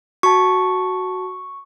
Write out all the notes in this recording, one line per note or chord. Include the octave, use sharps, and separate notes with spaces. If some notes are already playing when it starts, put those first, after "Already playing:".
F#4 A5 C#6